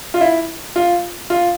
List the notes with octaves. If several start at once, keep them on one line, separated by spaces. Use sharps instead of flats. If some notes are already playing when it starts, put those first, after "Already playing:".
F4
E4
F4
F4